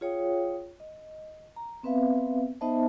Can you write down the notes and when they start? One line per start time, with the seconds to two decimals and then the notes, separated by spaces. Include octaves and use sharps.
0.01 F4 G#4 C#5 F5 G5 D#6
0.80 D#5
1.56 A#5
1.83 B3 C4 B4 E5 F5
2.61 B3 D#4 C5 D#5 E5 A5